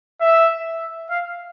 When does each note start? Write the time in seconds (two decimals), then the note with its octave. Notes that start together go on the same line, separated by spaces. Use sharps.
0.21 E5
1.10 F5